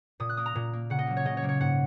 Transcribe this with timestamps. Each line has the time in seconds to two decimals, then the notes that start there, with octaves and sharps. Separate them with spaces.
0.20 A#2 D#6
0.29 F#6
0.37 A#3 D#6
0.46 A#5
0.55 A#2
0.73 A#3
0.90 C#3 F#5
0.99 D#5
1.07 F#3 A#3
1.17 C#5
1.25 C#3 D#5
1.37 C#5
1.42 F#3 A#3
1.49 C#5
1.60 G#2 F#5